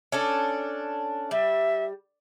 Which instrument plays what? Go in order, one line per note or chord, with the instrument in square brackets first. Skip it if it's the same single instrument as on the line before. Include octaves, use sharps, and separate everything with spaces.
[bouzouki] C#4 D4 A4
[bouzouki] G3 [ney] E5